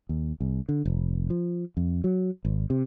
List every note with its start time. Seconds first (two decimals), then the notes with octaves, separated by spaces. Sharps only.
0.09 D#2
0.40 C2
0.69 D3
0.85 F1
1.30 F3
1.77 F2
2.04 F#3
2.45 G#1
2.70 C3